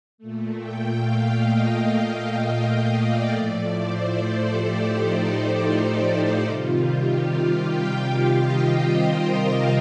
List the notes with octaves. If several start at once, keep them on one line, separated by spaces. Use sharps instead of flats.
A#2 A3
G5
F5
D#5
F5
G5
F5
D5
A2 F3 A3 D5
C5
A4
G4
D#4
D#4
C3 D#3 G3 F4
G4
F5
G5
D#5
C5
A#4